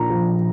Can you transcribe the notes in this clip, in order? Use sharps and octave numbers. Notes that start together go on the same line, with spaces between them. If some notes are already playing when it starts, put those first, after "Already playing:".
Already playing: A#1 A#2 A#5
F3